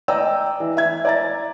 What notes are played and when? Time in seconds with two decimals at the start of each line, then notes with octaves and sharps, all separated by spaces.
0.08 D5 D#5 G5 A#5 E6
0.60 E3
0.77 E5 G#6
1.05 D5 A#5 A6